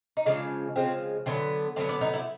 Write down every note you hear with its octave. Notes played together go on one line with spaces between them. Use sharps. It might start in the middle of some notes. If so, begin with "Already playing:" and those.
D#4
C#3 F3 G#3 D4
C#3 F3 G#3 C4
D3 F#3 B3 C4
D3 F#3 B3 C4
D4
D#4
E4